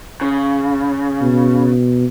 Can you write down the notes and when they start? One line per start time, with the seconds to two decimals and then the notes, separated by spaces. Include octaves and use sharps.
0.21 C#3
1.22 B2